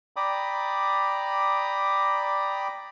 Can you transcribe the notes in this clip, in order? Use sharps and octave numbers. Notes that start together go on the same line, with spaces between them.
D5 G5 A#5 B5 D6 D#6